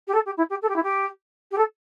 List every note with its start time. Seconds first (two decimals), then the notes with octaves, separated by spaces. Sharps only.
0.07 G4
0.14 A4
0.25 G4
0.37 E4
0.49 G4
0.62 A4
0.68 G4
0.76 E4
0.83 G4
1.51 G4
1.57 A4